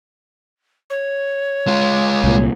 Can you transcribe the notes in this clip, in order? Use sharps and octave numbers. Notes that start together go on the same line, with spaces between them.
C#5
G#3 F4
C2 A#2